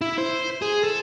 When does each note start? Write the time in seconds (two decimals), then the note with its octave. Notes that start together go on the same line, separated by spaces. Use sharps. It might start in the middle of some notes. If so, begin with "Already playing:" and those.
0.01 E4
0.18 C5
0.62 G#4
0.84 A4